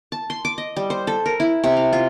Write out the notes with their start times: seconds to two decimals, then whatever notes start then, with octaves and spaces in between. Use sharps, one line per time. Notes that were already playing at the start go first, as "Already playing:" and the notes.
0.12 A5
0.30 C6
0.45 D6
0.58 D#5
0.76 G3
0.90 C5
1.07 A4
1.26 A#4
1.40 E4
1.64 C3
1.77 F5
1.93 F4